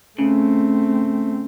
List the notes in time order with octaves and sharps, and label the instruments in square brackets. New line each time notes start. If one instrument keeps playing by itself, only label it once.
[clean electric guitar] C#3 [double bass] A3 C4